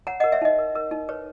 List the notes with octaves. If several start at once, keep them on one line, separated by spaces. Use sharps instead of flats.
C#5 F#5 A#5
A#4 D#5 F#5
C#5 E5
D#4 D#5
A#4
A#4
D#4
B4 C#5